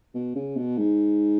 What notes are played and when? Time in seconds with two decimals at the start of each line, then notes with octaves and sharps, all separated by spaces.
0.14 B2
0.36 C#3
0.56 B2
0.78 G#2